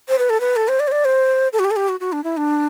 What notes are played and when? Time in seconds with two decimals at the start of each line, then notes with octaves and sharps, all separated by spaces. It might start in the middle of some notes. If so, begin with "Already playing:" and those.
0.09 C5
0.18 B4
0.30 A4
0.40 B4
0.56 A4
0.68 C5
0.80 D5
0.88 C5
0.92 D5
1.05 C5
1.53 A4
1.59 F#4
1.64 G4
1.71 A4
1.76 G4
1.89 F#4
2.00 F#4
2.12 D4
2.24 E4
2.37 D4